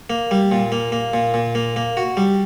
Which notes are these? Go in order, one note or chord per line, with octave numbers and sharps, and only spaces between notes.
A#3
G3
A#2
A#3
A#3
A#2
A#2
A#3
A#3
F#4
G3